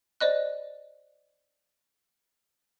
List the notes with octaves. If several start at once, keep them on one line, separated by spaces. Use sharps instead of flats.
C5 D5 D#5 F#6